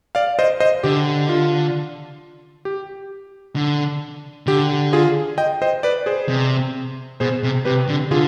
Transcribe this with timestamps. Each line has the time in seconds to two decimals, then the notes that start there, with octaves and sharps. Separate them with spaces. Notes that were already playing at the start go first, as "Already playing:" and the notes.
0.15 D5 F5
0.39 C5 D#5
0.60 C5 D#5
0.83 D3 G4
1.29 F4
2.65 G4
3.56 D3
4.47 D3 G4
4.93 F4 G#4
5.38 D#5 G5
5.62 C5 D#5
5.83 B4 D5
6.06 G#4 C5
6.29 C3
7.20 B2 G#4 C5
7.43 C3
7.65 C3 G4 B4
7.89 D3
8.11 D3 F4 G#4